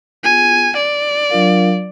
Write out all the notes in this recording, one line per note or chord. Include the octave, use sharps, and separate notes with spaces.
B3 F4 G#4 G#5
D5
F#3 D4 F4 A#4 F5